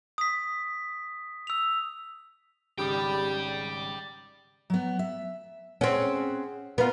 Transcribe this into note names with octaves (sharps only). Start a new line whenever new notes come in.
D#6 B6
E6 F7
G#1 C#3 G3 G4 D5 G5 D#6
F#3 B3
E5
C4 C#4 G#4 F#5
B3 F4 A#4